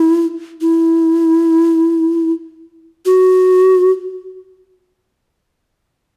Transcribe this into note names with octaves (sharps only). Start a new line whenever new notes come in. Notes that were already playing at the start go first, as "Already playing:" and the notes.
Already playing: E4
E4
F#4